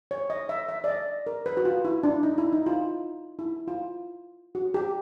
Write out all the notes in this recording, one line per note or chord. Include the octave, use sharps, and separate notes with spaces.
C#5
D#5
E5
E5
D5
D#5
A#4
B4
F#4
F4
E4
D4
D#4
E4
D#4
F4
E4
F4
F#4
G4